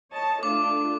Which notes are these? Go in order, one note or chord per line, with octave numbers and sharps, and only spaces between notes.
C#5 D#5 A5
A3 D4 F4 D6